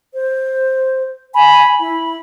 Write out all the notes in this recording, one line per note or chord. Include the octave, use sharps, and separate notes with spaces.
C5
G#5 B5
E4 B5